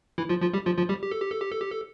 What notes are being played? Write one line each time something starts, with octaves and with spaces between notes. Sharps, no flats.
E3 E4
F3 F4
F3 F4
G3 G4
F3 F4
F3 F4
G3 G4
G4
A4
G4
A4
G4
A4
G4
A4